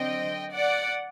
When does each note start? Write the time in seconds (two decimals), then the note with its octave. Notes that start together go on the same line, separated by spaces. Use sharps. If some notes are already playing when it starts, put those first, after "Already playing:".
Already playing: D3 F#3 C4 D#5 G5
0.52 D5 F#5